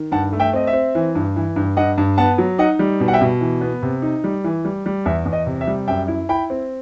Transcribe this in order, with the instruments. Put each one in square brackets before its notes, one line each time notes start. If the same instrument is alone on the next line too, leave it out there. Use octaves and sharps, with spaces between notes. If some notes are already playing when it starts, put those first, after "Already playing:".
Already playing: [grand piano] D#3
G2 F#5 A5
A3
E5 G5
C4 D#5
E5
C4
E3
G2
E3
G2
G2 D#5 F#5
G2
B3 F#5 A5
F#3
D#4 D#5 F#5
G3
B2
F#5
E5 G5
B2
E3
B3
C3
D#4
G3
E3
G3
G3
E2 E5
E2
D#5
C3
E5
G3
F#2 E5 G5
E4
E4 G5 B5
C4